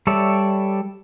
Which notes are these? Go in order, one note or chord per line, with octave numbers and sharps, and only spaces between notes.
G3 A4 C#5 D5 E5